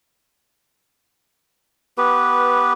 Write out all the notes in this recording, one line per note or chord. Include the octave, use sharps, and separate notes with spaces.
B3 G4 B4